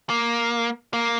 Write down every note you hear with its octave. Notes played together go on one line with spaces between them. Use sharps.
A#3
A#3